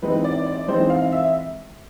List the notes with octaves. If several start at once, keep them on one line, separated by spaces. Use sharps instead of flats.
E3 G#3 C4 D#4 B4
D5
D5
E3 G#3 C4 D#4 C5
F5
E5